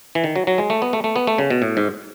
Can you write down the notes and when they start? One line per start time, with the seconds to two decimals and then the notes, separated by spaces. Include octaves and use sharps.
0.15 E3
0.24 D#3
0.36 F#3
0.47 F#3
0.58 G#3
0.70 A3
0.82 B3
0.93 A3
1.04 A3
1.16 B3
1.27 A3
1.38 C#3
1.50 B2
1.62 A2
1.77 G#2